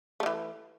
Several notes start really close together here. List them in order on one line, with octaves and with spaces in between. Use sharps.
A3 G3 E3